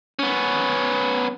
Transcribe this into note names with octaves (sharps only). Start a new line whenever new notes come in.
B3 C#4